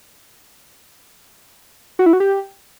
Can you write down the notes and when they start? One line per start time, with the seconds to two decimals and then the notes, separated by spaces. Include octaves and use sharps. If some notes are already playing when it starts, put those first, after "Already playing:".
1.99 F#4
2.06 E4
2.13 F#4
2.20 G4